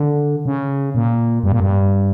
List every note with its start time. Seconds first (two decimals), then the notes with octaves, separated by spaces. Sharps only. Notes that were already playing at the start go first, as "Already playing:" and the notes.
Already playing: D3
0.46 C#3
0.95 A#2
1.44 G2
1.52 A#2
1.60 G2